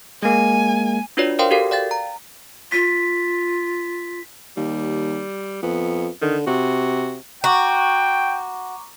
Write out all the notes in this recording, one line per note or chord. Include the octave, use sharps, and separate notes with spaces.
G#3 A#3 G#5
D4 F4 F#4 B4 C#5 D5
A#4 C5 D5 F5 G5 C6
F#4 G4 A4 A#4 F5
D5 F5 G5 A6
A#5
F4 B6
D#2 G3
F2 B3
D3 D#3
C3 F#4
F#4 G5 A#5 C#6 D6